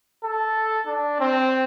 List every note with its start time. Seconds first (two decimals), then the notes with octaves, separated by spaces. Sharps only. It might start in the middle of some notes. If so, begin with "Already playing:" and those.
0.24 A4
0.87 D4
1.20 C4